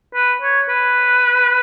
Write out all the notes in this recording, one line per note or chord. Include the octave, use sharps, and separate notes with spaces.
B4
C#5
B4